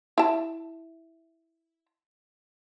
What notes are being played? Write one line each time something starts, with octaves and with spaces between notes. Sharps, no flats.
E4 A5